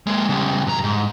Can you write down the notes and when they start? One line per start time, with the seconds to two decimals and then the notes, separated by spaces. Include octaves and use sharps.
0.07 G#3 A#3
0.29 C#3 G3
0.67 G2 A#5
0.83 G#2